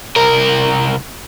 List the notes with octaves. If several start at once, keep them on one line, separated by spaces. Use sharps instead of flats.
C2 A#4